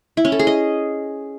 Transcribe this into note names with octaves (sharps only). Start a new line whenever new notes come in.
E4
C#4
A4
G#4
D#5